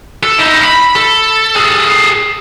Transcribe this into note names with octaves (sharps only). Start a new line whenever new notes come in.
A4
D#4 E4
B5
A4
G#4 A4